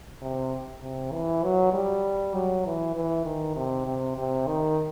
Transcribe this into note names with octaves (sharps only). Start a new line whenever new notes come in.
C3
C3
E3
F#3
G3
F#3
E3
E3
D#3
C3
C3
C3
D#3